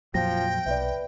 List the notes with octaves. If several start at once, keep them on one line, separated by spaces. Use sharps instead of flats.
F2 A#2 F3 F#3 G5 A#6
B1 B4 D5 E5